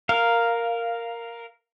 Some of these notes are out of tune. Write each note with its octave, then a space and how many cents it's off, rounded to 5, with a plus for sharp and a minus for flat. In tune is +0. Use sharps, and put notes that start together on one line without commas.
A#4 +0 F5 +0